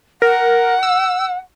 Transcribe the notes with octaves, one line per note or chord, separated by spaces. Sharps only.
A#4 F#5
E6